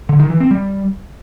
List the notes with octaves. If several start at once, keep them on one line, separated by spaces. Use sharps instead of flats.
D3
D#3
E3
C4
G3